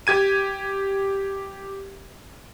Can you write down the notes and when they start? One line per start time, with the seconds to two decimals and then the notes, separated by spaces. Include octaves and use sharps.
0.07 G4 G#6 D#7